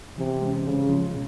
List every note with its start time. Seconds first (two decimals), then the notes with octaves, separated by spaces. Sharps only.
0.18 C3 E3
0.41 G#3 C#4
0.64 G#2 C#3
0.88 F3 G#3 C#4 F4
1.13 B2